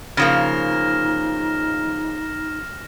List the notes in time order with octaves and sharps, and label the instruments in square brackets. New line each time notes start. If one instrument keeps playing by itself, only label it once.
[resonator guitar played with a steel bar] C#3 F3 A#3 [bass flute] D#4 [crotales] F6 A#6 E7